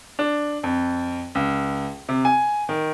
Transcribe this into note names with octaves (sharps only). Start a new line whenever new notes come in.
D4
F2
C#2
C3
G#5
D#3